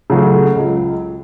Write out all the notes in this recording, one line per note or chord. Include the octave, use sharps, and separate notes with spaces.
C#3 F#3 A3
C#2